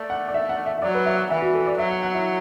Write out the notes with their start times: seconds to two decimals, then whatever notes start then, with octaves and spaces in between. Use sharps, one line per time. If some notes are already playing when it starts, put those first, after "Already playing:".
Already playing: A3 D5
0.10 F#5
0.28 D5
0.34 E5
0.49 F#5
0.66 E5
0.78 E5
0.82 F#3 D5
0.95 B4
1.06 E5
1.18 F#5
1.30 E3 E5
1.42 F#4
1.54 A4
1.66 D5
1.78 F#3 E5
1.90 F#5
2.03 F#5
2.14 E4